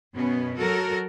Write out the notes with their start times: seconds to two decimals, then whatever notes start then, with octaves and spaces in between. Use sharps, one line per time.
0.16 F#2 B2 B3 C#4
0.57 F#3 F#4 A4 A#4